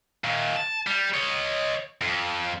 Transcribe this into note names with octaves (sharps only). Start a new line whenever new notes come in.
A#2 D#3
A5
G3
C#5 D#5
F2